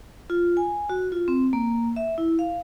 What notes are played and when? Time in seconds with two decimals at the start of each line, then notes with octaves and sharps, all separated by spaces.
0.30 F4
0.57 G#5
0.90 F#4
1.12 F4
1.28 C4
1.53 A#3
1.96 E5
2.18 E4
2.39 F5